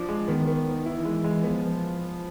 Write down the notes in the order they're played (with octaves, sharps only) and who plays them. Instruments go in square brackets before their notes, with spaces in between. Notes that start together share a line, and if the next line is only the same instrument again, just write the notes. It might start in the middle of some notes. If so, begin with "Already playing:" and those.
Already playing: [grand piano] F3 D4
G#3
[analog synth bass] D#3 [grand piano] B3
[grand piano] B3
B3
[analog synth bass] E3 [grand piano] E4
[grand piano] G#3
G#3
[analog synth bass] F3 [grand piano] B3